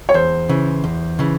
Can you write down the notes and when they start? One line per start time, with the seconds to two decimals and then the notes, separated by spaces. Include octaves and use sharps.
0.09 C#5
0.14 E2 C5
0.49 C#3 E3
0.84 E2
1.19 C#3 E3